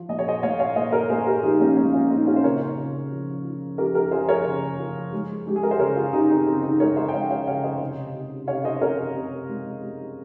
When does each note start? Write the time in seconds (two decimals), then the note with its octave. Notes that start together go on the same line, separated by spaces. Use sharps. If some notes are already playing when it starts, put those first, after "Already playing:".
Already playing: F3
0.09 A#2 D#5
0.19 C#5
0.28 C5 D#5
0.43 A#2 C#5 F5
0.60 C#5 F5
0.76 A#2 C5 D#5
0.92 A#4 C#5
1.10 A#2 G#4 C5
1.26 G4 A#4
1.43 F3 D#4 G4
1.60 A#3 C#4
1.77 G#3 A#3 C#4
1.93 C#4 F4
2.10 A#2 C4 D#4
2.27 C#4 F4
2.36 C5
2.44 C#3 A#4 C#5
2.77 C#3
3.12 F3
3.44 F3
3.78 F3 G4 A#4
3.95 G4 A#4
4.11 F3 G#4 C5
4.29 A#4 C#5
4.45 C#3
4.79 F3
5.13 G#3
5.46 G#3 G4
5.56 G#4
5.63 A#4
5.71 C5
5.79 C#3 A#4 C#5
5.96 F4 G#4
6.13 C#3 D#4 G4
6.30 C4 D#4
6.47 C#3 C4
6.63 C4 D#4
6.80 G#3 A#4 C#5
6.97 C5 D#5
7.08 G5
7.13 G#3 C#5 F5
7.30 C#5 F5
7.47 C#3 C#5 F5
7.64 C5 D#5
7.80 C3
8.14 C3
8.47 C3 C#5 F5
8.64 C5 D#5
8.81 C3 A#4 C#5
9.15 C3
9.49 G#3
9.82 G#3